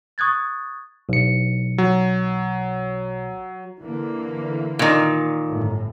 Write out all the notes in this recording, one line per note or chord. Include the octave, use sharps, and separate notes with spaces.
C#6 D#6 F#6 G#6 A6
B1 C#7
F#3
D3 E3 A#3
A#2 D#3
G1 A2